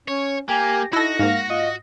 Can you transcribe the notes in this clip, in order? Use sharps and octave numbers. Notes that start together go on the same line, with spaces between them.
C#4 C#5
A#3 G4 G#5
D#4 E4 F#4 A4 A#6
G#2 A#3 F5
F4 D#5